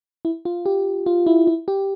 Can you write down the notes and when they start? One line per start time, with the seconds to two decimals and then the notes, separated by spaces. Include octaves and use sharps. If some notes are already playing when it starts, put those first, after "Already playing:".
0.25 E4
0.45 F4
0.66 G4
1.06 F4
1.27 E4
1.47 E4
1.68 G4